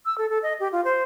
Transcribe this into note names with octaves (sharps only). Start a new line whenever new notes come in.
E6
A4
A4
D#5
G4
F4
C5